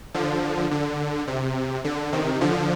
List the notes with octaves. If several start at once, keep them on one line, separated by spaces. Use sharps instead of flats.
D3 F3
D3
C3
D3
C3 D#3
D3 F3